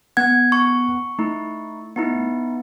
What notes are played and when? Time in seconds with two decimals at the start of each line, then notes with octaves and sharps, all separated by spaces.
0.17 B3 F#5 G#6
0.52 C#6
1.19 A3 D#4 E4
1.96 B3 D#4 E4